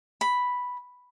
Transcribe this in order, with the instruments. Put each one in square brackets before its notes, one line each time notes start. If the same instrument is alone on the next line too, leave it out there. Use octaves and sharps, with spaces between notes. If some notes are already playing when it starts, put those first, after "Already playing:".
[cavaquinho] B5